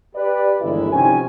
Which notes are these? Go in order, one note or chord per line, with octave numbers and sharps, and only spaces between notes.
G4 B4 D5
G1 D#2 E3 G#3 E4
C3 F3 C4 C#4 D#4 G#5